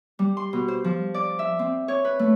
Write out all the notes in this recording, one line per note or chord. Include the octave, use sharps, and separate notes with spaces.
G3
C6
B2
C5
F3
D5
E5
C4
C#5
B4
A3